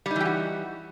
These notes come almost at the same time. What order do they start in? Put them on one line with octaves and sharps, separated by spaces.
G3 D#4 E3 G4 F#4